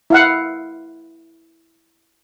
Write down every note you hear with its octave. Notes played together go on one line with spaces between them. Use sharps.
E4 F5 F#5